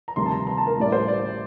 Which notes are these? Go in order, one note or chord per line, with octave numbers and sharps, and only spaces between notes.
A#5
D2 C3 D#3 G3 C6
A5
A#5
A#5
A5
A#4
A1 A2 G3 D5
C5
D5